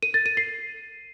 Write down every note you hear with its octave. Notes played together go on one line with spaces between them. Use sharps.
D#7
A6
D#7
C7